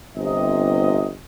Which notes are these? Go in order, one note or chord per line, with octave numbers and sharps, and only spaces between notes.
G1 C3 D#5